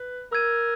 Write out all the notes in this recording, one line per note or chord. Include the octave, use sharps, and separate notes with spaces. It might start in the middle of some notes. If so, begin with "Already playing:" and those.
Already playing: B4
A#4 E6 G#6 D#7